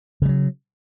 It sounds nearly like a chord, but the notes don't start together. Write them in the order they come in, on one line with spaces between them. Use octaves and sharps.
C#3 G3 F#3